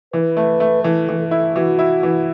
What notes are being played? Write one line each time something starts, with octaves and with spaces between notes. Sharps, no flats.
E3 B4
A3
A3
E3 A4
E3
A4
E4
E3 F#4
E4
E3